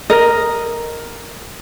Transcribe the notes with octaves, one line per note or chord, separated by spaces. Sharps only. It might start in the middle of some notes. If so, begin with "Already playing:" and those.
A#4 D#5